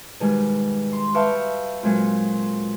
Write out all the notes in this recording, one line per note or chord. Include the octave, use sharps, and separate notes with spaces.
G#2 B2 D#3 G3 G#3
C6
B4 E5 F5 G5 A5 C#6
A#2 F#3 G#3 C4 F4